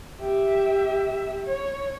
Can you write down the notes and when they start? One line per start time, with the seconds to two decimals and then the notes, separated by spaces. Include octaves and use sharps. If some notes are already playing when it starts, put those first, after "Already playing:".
0.20 G4 E5
1.46 C#5